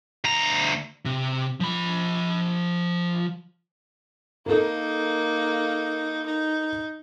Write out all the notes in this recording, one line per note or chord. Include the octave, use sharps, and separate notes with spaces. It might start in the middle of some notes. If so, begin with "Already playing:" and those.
D2 A#5
C3
F3 B5
A#3 D#4 A4 A#4
D#4